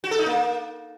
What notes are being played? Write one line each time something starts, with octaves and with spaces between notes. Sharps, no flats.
F#4
A4
D#4
A#3